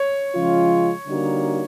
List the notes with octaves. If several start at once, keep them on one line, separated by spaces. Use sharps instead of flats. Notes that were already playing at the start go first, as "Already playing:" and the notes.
Already playing: C#5
C#3 F3 G#3 C#4 F4
D3 G3 A#3 D#4 F#4